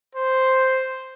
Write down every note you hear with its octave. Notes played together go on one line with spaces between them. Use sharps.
C5